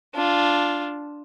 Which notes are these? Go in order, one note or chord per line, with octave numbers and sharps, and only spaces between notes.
D4 F4